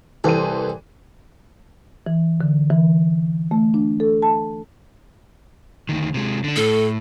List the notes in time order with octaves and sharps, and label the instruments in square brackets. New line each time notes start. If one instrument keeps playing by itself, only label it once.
[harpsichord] C2 [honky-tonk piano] E3 C5 D#7 [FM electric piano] A4
[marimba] E3
D3
E3
A3
D4
A4
A5
[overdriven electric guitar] D2 D#3
C3 G#3
D3 D4
[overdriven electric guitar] A2 [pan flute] A4